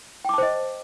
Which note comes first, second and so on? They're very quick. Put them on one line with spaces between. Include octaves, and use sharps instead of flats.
G5 D6 A5 C5 D#5